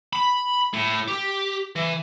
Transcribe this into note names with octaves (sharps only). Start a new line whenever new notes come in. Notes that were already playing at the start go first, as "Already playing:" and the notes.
B5
A2
G4
E3